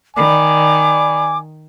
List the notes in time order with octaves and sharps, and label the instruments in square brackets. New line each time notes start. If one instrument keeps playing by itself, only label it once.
[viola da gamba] D#3 [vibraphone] D5 B5 [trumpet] G#5 [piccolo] D6